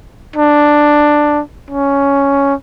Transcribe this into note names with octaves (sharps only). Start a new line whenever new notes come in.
D4
C#4